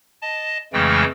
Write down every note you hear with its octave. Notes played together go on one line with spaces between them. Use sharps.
D#5 A5
F2 C#3 E3 G#3 A3 G5